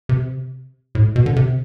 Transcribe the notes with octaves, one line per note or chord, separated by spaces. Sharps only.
C3
A2
B2
D3
C3